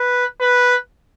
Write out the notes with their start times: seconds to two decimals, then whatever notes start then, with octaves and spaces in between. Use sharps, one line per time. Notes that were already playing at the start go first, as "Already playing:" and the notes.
Already playing: B4
0.41 B4